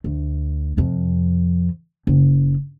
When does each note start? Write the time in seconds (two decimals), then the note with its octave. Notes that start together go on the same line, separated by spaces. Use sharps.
0.04 D2
0.77 F2 C3
2.07 F#1